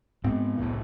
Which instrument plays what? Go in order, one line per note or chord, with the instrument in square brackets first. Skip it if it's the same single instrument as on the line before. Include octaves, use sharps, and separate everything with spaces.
[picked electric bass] G#2 C4 [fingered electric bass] B3
[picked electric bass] F#1 C2 A2